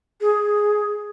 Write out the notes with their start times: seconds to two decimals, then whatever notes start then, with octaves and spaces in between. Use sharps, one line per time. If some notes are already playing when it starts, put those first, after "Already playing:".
0.21 G#4